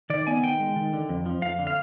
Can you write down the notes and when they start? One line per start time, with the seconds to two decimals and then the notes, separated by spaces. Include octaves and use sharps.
0.10 D#3 D5
0.27 B3 G#5
0.43 D#3 G5
0.60 G#3
0.76 D#3
0.93 D3
1.09 F2
1.26 F3
1.42 F2 F5
1.59 D3
1.67 F5